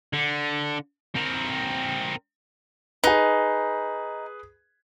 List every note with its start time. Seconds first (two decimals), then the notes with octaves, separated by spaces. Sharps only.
0.13 D3
1.16 C4 A#4
3.04 D#4 G#4 B4